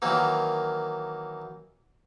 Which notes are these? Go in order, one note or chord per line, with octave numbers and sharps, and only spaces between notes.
D#3 E3 F#3 A#3